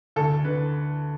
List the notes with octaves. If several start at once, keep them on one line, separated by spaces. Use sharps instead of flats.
D2 A4
D3 B4